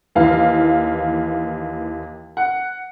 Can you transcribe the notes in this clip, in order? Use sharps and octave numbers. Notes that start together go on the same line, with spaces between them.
D#2 E3 F5
F#5